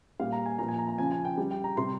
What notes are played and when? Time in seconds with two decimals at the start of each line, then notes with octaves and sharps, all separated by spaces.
0.19 A#2 G3 F5
0.32 A#5
0.46 G#5
0.58 A#2 F3 A#5
0.68 G#5
0.78 A#5
0.88 A#5
0.98 C#3 F3 G#5
1.12 G#5
1.25 G5
1.38 C#3 G3
1.51 G5
1.64 A#5
1.77 C3 G3 C6